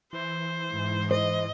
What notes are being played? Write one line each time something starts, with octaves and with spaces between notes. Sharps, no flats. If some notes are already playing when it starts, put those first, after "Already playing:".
E3 C5
G#2
C5 D#5